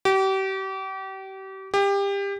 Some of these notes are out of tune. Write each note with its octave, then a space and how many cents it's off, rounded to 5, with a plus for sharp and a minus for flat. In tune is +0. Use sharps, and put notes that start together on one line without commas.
G4 -35
G4 +25